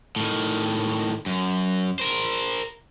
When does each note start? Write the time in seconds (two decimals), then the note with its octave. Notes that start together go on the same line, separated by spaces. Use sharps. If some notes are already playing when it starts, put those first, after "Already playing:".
0.16 A2 D#3
1.26 F#2
2.00 A#4 C5